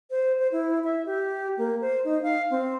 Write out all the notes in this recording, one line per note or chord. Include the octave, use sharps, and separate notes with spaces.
C5
C5
E4
E5
G4
A#3
C5
D#4
F5
C4